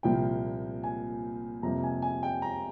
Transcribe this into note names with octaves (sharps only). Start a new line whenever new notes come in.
C2 A#2 F3 A#3 G5
G#5
F2 C3 G3 A#3 A#5
G#5
G#5
G5
A#5